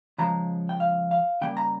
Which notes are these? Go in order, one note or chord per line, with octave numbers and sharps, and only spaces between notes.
C#3 F3 G#3 A#5
G5
F5
F5
C#3 G3 A#3 G5
A#5